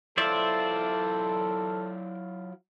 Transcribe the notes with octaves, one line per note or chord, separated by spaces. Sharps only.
F#3 E4 F4 A4 C5 D5 E5